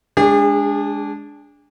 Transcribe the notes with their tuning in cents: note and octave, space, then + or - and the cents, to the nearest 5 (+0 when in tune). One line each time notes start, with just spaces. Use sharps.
G#3 +0 D4 -15 G#4 -40